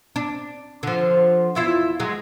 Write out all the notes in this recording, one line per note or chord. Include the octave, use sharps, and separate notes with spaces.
D4
D3 F3
E2 E4 F4
F#3 G#3